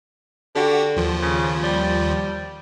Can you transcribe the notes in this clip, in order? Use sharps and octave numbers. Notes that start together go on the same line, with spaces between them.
D3 F#4 G4
D#2 F3
C#3
G3